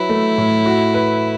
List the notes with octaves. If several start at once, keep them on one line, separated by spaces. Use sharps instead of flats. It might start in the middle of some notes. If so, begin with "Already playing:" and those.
Already playing: F#3 E4 B4
A3
A2
F#4
B4